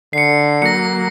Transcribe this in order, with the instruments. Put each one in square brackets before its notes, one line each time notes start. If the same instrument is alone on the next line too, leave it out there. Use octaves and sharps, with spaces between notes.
[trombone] D3 [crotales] C7 C#7
[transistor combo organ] F#3 A#3 [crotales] A#6 C#7